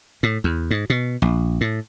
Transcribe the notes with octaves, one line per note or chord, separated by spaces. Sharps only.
A2
E2
G#2
B2
A#1
A2